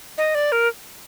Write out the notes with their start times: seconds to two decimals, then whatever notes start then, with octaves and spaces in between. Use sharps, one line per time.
0.18 D#5
0.35 D5
0.52 A#4